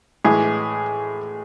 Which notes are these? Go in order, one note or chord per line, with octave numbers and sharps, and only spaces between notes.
A2 E3 G#3 G#4